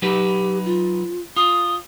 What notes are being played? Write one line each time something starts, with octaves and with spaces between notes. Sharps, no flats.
F#3 D#4 G4 B4
F4
F4 D#6